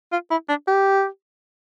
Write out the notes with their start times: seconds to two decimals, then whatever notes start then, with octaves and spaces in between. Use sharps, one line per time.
0.12 F4
0.31 E4
0.49 D4
0.68 G4